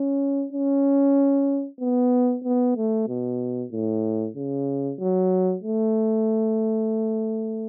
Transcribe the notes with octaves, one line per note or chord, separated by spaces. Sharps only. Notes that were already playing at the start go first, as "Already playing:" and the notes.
Already playing: C#4
C#4
B3
B3
A3
B2
A2
C#3
F#3
A3